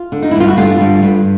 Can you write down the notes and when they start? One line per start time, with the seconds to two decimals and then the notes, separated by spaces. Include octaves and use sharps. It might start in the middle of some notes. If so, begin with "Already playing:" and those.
Already playing: F4
0.12 D3
0.22 D#4
0.31 G2 E4
0.40 F4
0.48 F#4
0.57 D3 F4 G4
0.81 G2
1.03 G2